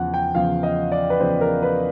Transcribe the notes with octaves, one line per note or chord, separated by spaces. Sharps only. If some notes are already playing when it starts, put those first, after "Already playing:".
Already playing: E2 C#3 F3 F#5
G5
E2 C#3 F3 F5
D#5
D5
B4
E2 C#3 F3 C5
A#4
B4